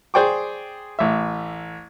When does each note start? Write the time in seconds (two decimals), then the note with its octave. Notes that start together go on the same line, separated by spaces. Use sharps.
0.14 G#4 C5 D5 G5 C#6 D6
0.99 A1 E5